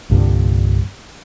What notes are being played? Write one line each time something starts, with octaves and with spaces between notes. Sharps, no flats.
C2 G2 A#2 D3